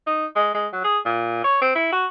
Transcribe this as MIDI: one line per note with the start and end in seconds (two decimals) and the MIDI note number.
0.07 0.26 63
0.36 0.52 56
0.54 0.67 56
0.73 0.82 54
0.84 0.98 68
1.06 1.41 46
1.44 1.60 73
1.62 1.75 60
1.75 1.92 64
1.92 2.07 66